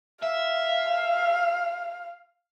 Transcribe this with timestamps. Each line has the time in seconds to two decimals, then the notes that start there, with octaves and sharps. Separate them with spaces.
0.23 E5 F5